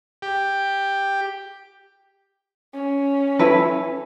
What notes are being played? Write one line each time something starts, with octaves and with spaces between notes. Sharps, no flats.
G4
C#4
E4 A4 B4